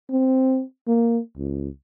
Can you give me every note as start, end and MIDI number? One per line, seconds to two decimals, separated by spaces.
0.10 0.62 60
0.88 1.19 58
1.36 1.68 37